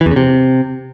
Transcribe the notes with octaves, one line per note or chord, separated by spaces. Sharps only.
E3
E2
C#3
C3